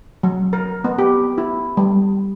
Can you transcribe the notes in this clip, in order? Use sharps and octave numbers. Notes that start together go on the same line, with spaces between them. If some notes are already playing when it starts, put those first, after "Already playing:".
F#3
A#4
B3
G4
E4
G3